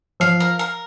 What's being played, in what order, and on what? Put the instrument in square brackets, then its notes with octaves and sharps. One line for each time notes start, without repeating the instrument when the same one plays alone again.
[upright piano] F3 [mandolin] F5
[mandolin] A#4
A#4